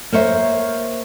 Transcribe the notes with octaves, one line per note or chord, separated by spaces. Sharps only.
A#3 C5 C#5 E5